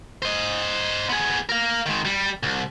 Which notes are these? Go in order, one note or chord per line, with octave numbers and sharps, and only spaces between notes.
C5 D#5
B3 G#4
A#4 F5
D#3 G#3
G3
C2